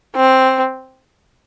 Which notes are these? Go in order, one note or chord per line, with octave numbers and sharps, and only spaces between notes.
C4